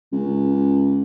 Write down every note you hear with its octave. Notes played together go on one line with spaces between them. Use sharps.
C#2